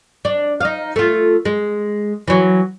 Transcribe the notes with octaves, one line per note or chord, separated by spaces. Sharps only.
D4
D#4 F5
A3 F4
G#3
E3 F#3